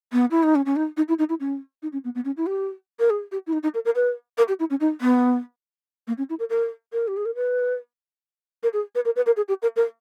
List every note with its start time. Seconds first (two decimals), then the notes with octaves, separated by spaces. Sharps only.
0.13 B3
0.31 E4
0.43 D#4
0.55 C#4
0.66 C#4
0.76 D#4
0.97 D#4
1.08 E4
1.19 D#4
1.29 E4
1.40 C#4
1.83 D#4
1.93 C#4
2.04 B3
2.15 B3
2.25 C#4
2.37 E4
2.47 G4
3.00 A#4
3.10 G#4
3.32 G4
3.47 E4
3.53 D#4
3.63 D#4
3.74 A#4
3.85 A#4
3.95 B4
4.38 A#4
4.48 G4
4.60 E4
4.70 C#4
4.80 D#4
5.01 B3
6.08 A#3
6.18 C#4
6.30 E4
6.39 A#4
6.50 A#4
6.93 A#4
7.08 G4
7.17 G#4
7.25 A#4
7.35 B4
8.63 A#4
8.73 G#4
8.95 B4
9.05 A#4
9.16 B4
9.26 A#4
9.37 G#4
9.48 G4
9.62 A#4
9.76 A#4